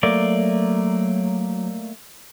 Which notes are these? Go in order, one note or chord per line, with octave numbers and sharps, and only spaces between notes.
F#3 A3 A#3 D5